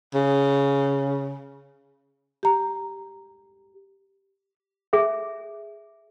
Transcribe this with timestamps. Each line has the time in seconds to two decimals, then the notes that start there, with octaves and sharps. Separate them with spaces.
0.14 C#3
2.43 G4 A#5
4.93 G#4 E5